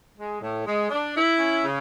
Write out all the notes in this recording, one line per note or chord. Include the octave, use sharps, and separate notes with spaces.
G#3
A2
G#3
D4
E4
C#4
C#3